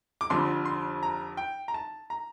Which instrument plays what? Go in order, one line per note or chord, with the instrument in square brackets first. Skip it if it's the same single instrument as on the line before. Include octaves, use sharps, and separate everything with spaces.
[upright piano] D6
F1 F2 D3 C6
C6
A#5
G5
A#5
A5
A#5